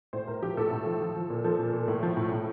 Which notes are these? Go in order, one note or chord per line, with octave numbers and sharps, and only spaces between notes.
A2 C5
A2 A#4
F3 G4
A2 A4
A2
F3
F3
F3
A#2
F3 A4
A#2
A#2
A2
F3
A2
A2